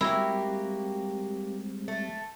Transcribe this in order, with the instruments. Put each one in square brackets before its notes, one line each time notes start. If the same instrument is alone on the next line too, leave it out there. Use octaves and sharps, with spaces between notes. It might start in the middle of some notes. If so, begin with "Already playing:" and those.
[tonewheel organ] G3 G#3 C4 [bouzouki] A#3 F#4 G4 [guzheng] E4
[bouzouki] A3